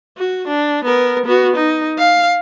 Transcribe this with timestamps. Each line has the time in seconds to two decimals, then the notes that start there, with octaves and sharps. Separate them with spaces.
0.17 F#4
0.47 D4
0.84 B3 A#4
1.25 B3 F#4
1.56 D#4
1.99 F5